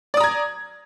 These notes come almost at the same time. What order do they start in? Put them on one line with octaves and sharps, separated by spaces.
D5 D#6 A#5 G#6